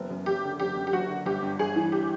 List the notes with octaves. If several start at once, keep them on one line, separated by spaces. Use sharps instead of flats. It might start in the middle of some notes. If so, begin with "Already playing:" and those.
Already playing: F#1 B3
F#2
F#1 G4
D3
F#1 G4
F#2
G4
F#1 F#4
D3
G1 G4
G2
G1 G#4
E3
G4